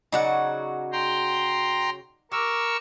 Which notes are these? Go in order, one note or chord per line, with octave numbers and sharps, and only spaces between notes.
C#3 F#3 D#4 F#4 D5 F#5
G5 A#5 C6
G4 A#4 C#6 E6